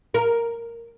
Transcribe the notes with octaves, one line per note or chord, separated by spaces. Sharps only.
A#4